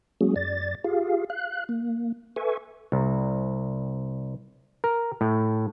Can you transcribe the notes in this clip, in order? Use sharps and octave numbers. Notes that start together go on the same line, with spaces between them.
F#3 G#3 A#3 C#4 F#4 G#4
F#2 D5 A6
F4 G4 G#4 F5
F5 F#6
A#3
A4 B4 E5 G#5 C#6
C2
A#4
A2